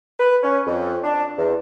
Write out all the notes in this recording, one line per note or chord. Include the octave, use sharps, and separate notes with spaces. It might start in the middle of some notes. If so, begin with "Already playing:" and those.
B4
C#4
F2
D4
E2